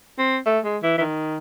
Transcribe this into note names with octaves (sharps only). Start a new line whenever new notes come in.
C4
A3
G#3
E3
E3
D#3